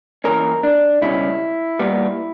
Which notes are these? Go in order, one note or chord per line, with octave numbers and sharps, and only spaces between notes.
F#2 E3 A#3 C#4 A#4
D4
C#2 B2 G3 C#4 E4
A#2 G3 B3